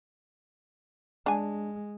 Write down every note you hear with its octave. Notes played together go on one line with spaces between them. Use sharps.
G#3 D4 G#5